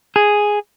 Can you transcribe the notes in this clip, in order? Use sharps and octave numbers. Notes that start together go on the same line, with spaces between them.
G#4